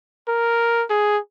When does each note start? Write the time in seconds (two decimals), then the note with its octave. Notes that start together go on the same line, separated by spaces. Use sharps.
0.28 A#4
0.90 G#4